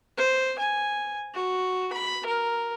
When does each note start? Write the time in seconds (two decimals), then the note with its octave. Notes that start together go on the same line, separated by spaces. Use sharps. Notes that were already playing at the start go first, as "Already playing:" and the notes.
0.17 C5
0.59 G#5
1.34 F#4
1.92 B5
2.26 A#4